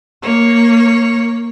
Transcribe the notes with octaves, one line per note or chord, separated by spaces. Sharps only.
A#3 C#5